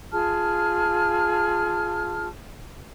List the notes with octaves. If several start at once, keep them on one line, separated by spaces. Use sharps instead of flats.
F4 G#4 A5 F6